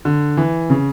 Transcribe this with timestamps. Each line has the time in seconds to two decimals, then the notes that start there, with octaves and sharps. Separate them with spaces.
0.05 D3
0.37 E3
0.70 C#3